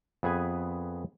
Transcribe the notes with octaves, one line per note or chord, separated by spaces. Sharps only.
F2 B3 G#4 B4 G#5